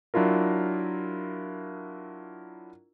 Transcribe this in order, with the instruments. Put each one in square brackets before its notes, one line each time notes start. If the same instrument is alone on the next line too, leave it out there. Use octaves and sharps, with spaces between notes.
[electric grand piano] F#3 D4 E4 F4 A#4